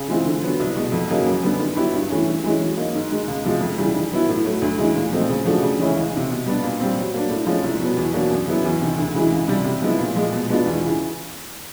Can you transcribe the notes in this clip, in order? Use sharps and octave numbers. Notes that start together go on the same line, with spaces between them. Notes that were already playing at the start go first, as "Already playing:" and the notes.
Already playing: C#3
E3 G#3 C4 F4
D3
F#3 B3
C2
B2 G#3
F2
C#3 F#3 A#3 D#4
F#2
D3 G3 B3
D#3
F#3 B3 E4 G4
G2
E3 A3 C#4
G2
E3 G#3 C#4
F#3
A#3 D#4 F#4
G#2
D#3 G#3
C#2
C3 F3 G#3
F2
C#3 E3 G3
D#3
F#3 B3 E4
A2
F#3 A3
D2
C#3 E3 G#3
A#2
F3 A3 C4 D#4
C#3
F3 A3 D4 F#4
C#3
E3 G#3 C#4 E4
C#2
C3 D#3
B2
G3 B3 D4
A#2
G3 C4
F#3
A#3 D4
A2
F3 G#3 C#4 F4
C2
B2 F#3 B3
E2
B2 F#3 A#3 D4
F#2
C#3 F#3 B3 E4
E2
C3 D#3
D2
C#3 E3 G#3
C#2
C3 D#3 G3
C3
F3 G#3 B3 E4
A#2
F3 G#3
B2
G#3 B3 D4 F4
E2
C#3 E3